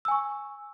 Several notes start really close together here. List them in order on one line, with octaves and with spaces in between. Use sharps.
E6 G#5 C#6